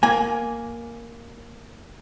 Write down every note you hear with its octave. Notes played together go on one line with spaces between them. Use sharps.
A#3 G#5